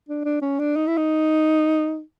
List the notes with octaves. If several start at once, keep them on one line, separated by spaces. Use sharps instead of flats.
D4
D4
C#4
D4
D#4
E4
D#4